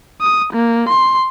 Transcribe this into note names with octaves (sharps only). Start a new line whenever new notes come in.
D#6
A#3
C6